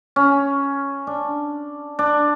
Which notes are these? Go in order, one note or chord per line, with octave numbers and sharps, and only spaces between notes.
C#4
D4
D4